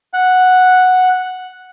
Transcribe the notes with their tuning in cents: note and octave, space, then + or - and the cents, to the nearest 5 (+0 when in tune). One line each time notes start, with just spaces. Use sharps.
F#5 -5